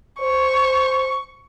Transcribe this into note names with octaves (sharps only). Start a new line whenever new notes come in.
C5 C#6